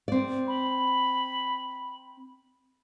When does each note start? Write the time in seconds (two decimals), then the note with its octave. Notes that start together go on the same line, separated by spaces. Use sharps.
0.08 C4 D5
0.48 B5